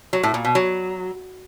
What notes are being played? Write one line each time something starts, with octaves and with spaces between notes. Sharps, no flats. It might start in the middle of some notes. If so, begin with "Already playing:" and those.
F#3
A2
A#2
B2
F#3